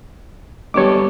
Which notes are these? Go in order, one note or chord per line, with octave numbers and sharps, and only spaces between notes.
G2 G3 B3 A4 C#5 D#5 D6